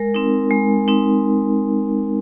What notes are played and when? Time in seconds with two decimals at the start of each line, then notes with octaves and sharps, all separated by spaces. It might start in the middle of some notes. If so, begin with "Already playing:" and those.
Already playing: G#3 A#4
0.14 C4 D#4
0.51 G#3
0.88 C4 D#4